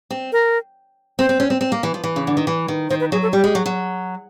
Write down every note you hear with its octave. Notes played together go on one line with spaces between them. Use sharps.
C4
A#4
C4 C5
C4
C#4
C4
C4
A#3
E3
F3
E3
C#3
D3
D#3
E3
D#3
D#3 C5
B4
F#3 G#4
A4
G3 G4
G#3
F#3
F#3